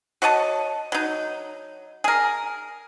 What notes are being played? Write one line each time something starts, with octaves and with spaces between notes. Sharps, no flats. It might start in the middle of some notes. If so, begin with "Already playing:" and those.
F#4 C#5 D#5 A5
F#3 D#4
G#4 A#4